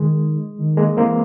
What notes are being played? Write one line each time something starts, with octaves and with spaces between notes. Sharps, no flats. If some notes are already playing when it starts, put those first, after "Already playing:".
Already playing: D#3 G#3
D#3
G#3 A#3
E3 A#3 C4